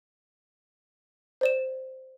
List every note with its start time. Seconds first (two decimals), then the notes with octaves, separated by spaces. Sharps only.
1.41 C5 D5 E7